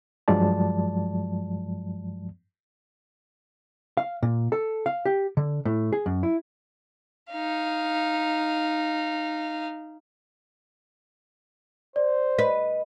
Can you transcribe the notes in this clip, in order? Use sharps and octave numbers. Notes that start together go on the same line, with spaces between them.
G2 F3 F#3 G#3 D5 A5
F5
A#2
A4
F5
G4
D3
A2
G#4
F#2
E4
D#4 F5
C5 D5
B4 D#5